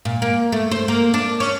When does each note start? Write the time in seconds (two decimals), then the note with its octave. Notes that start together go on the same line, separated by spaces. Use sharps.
0.05 A#2
0.22 A#3
0.52 A3
0.71 C5
0.88 A#3
1.14 D4
1.40 C#4